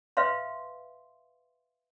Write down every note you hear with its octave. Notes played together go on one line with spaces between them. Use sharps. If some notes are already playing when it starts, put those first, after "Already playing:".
B4 E5 F5 C6